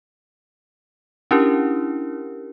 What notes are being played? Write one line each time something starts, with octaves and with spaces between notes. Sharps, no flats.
C#4 D4 E4 G4 A#4